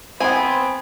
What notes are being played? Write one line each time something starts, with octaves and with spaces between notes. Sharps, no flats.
B3 C4 G#5 B5